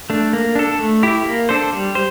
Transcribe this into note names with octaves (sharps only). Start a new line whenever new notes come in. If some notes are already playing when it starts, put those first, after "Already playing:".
A3 D4
A#3
D4 A4
A3
E4 G4
A#3
D4 A4 C5
G3
C5